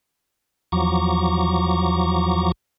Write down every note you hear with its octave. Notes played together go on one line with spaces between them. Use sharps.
E2 F3 F#3 A#5 C#6 D6